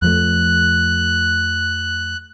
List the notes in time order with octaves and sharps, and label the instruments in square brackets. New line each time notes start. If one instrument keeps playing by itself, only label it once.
[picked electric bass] F2 F3 A3 [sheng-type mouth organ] F#6